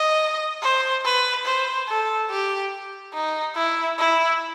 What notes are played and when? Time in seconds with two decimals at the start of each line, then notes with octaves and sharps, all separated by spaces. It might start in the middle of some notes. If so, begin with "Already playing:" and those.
Already playing: D#5
0.62 C5
1.05 B4
1.46 C5
1.88 A4
2.30 G4
3.13 D#4
3.55 E4
3.98 E4